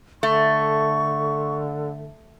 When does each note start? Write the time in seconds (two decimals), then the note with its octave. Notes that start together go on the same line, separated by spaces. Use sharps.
0.23 D3 A3 C#6